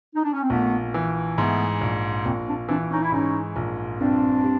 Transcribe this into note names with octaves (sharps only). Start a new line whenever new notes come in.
D#4
D4
C#4
C4
A#1 A3 B3
E3
G#2 A3 B3
A#1
A#1 A#3 C4
C4 D4
E3 C4 D4
C#4 D#4
E4
G#2 C#4 D#4
A#1
G2 C4 D4
G3